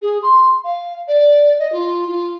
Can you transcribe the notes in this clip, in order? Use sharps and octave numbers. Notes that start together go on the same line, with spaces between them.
G#4
C6
F5
D5
D#5
F4
F4